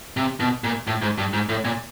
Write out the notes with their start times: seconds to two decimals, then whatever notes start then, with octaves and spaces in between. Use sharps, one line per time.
0.17 C3
0.40 B2
0.64 A#2
0.87 A2
1.02 G#2
1.18 G2
1.33 G#2
1.49 A2
1.65 A#2